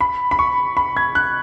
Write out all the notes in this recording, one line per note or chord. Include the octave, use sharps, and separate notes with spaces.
B5
B5
C#6
B5
G#6
F#6